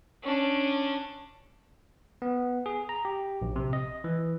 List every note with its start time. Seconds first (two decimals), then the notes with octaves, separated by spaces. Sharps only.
0.23 C#4 D4
2.22 B3
2.66 G#4
2.89 A#5
3.05 G4
3.42 A#1
3.56 C3
3.73 D#5
4.04 E3